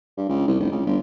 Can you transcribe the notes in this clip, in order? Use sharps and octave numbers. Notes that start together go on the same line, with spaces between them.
G2
C#2
C2
F1
C#2
G1